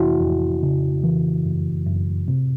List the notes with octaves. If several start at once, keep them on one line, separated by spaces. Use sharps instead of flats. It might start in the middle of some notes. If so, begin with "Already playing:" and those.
Already playing: F2 C3 E3 E4 F#4
F2
C#3
E3
F#2
F#2
C3